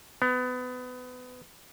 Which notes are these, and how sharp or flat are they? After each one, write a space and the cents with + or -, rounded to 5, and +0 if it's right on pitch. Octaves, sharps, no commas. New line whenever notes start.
B3 +25